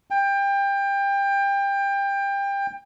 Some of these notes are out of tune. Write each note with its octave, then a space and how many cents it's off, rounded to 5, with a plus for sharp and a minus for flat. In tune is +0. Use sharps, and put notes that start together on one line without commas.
G5 +25